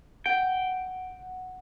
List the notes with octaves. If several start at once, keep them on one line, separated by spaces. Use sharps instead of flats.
F#5 G5